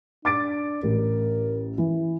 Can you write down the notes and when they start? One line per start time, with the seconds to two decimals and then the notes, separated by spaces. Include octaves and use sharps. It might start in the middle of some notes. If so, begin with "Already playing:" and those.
0.25 D4 D6 A6 D7
0.83 A1 A#4
1.78 E3